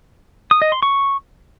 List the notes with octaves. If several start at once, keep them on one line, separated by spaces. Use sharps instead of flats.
D#6
D#5
C6
C#6